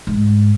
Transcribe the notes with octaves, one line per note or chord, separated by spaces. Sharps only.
G#2